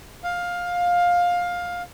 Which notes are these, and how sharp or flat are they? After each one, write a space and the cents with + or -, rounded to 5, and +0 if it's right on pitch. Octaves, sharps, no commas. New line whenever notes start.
F5 +15